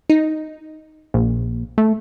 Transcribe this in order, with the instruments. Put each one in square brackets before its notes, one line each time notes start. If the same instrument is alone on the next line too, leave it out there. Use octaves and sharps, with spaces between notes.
[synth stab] D#4
[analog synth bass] A#1
A3